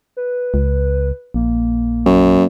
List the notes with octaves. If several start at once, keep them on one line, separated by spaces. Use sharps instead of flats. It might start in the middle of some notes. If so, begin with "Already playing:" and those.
B4
C#2
A#1 A#3
F#2